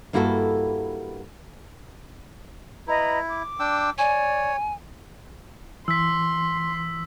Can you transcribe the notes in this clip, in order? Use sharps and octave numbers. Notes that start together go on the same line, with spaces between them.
G2 A#3 E4 F#4 G4 A4
E4 B4 D#5 A#5
D6
D4 G5 E6
C#5 D5 G#5
E3 C6 E6 B6